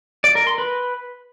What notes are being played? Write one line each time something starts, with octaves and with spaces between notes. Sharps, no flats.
D5
A#4
C6
B4